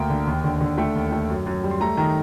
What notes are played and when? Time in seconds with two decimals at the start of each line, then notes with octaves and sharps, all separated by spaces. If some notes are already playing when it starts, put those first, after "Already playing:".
Already playing: D2 A#3 G5
0.10 D3
0.27 D#2
0.44 D3
0.61 D3
0.78 A3 G5
0.95 D#2
1.12 A3
1.29 F#2
1.46 F#2
1.63 G3
1.71 C6
1.80 A3 A#5
1.97 D#3 A#5